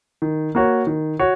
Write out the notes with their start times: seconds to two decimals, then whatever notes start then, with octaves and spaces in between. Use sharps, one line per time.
0.22 D#3
0.55 A#3 F#4 C#5
0.87 D#3
1.19 F#4 C#5